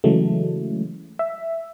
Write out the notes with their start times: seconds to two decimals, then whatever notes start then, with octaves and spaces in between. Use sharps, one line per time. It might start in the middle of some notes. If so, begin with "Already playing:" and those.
0.04 C#3 E3 F#3 G#3 A3
1.19 E5